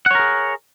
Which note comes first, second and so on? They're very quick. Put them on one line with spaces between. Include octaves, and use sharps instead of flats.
F#5 C#5 A#4 G#4